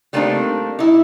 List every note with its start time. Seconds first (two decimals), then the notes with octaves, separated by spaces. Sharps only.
0.13 G3 A3 A#3 C4 D4 D#4
0.79 D#4 E4